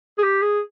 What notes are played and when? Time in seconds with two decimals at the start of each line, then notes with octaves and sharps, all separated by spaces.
0.18 G#4
0.23 G4
0.42 G#4